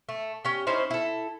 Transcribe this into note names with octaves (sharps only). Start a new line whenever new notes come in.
A3
C#4 G4
C#4 D#4 E4 C5
E4 A4